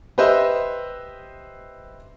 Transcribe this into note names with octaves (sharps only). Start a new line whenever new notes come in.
G4 B4 C5 D#5 E5